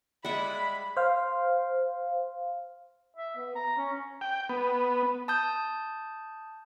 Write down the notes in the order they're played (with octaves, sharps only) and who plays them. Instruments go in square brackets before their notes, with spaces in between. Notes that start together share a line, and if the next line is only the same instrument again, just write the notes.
[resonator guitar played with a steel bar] G3 G#3 [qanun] E5 F#5 [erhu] B5
[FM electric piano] C5 F5
[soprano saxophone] E5
B3
A#5
C#4
[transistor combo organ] G5
B3
[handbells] A5 D#6 G6